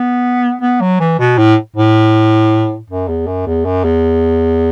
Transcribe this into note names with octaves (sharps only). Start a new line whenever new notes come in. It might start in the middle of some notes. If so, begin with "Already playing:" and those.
Already playing: B3
B3
F#3
E3
B2
A2
A2
F#2
E2
F#2
E2
F#2
E2